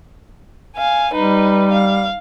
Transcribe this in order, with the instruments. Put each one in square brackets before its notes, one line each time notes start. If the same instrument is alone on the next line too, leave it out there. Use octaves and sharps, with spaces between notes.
[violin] F5 G#5
[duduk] G3 [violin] D#4 B4
[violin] F5